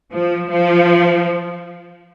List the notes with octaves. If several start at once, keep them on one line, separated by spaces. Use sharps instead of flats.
F3
F3